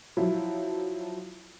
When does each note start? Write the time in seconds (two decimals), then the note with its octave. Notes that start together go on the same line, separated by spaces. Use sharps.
0.17 F3 F#3 E4